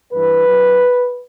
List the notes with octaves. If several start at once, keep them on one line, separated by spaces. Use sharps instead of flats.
G2 E3 B4
F#2 F#3